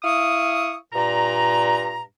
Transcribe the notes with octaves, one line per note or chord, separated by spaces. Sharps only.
E4 F5 C#6 D#6
G2 A#2 A#5